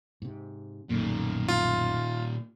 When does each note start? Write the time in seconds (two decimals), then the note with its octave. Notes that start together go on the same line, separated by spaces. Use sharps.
0.22 G#2 C3
0.89 B1 F#2 A#2 D#3 A3
1.48 F4